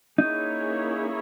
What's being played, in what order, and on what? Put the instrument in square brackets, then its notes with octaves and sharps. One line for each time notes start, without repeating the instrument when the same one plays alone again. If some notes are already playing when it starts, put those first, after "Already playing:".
[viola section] A#3 C#4 E4 G#4 C#5 [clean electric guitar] D#4